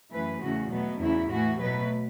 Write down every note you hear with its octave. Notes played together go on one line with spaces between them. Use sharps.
F#2 E3 A3 B4
E2 C#3 E3 A3 F#4
B2 F#3 A3 B3
E2 C#3 F#3 E4
A2 E3 A3 F#4
B2 F#3 A3 B4